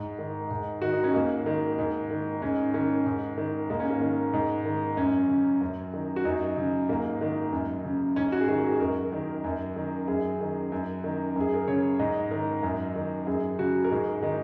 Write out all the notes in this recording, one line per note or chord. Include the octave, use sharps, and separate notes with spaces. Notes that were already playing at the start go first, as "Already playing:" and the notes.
Already playing: G#2
D#3
G#2
D#3 F#4
D#4
C#4
G#2 A#3
D#3
G#2
D#3
G#2 C#4
D#3 C#4
G#2
D#3
G#2 A#3
C#4
A#3
D#3
G#2
D#3
F#2 C#4
C#3
F#2
D#3
F#4
F#2 D#4
C#3
G#2 A#3
D#3
F#2
C#3
G#2 C#4
F#4
G#4
D#3 F#4
G#4
F#2 A#4
D#3
F#2
D#3
F#2 G#4
D#3
F#2
D#3
F#2 G#4
A#4
C#3 C#5
G#2 D#5
D#3 A#4
F#2
D#3
F#2 G#4
C#3 F#4
A#4
G#2 G#4
D#3 D#4